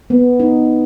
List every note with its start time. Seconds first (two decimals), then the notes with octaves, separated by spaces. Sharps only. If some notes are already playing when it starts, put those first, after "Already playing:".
0.10 B3
0.40 D#4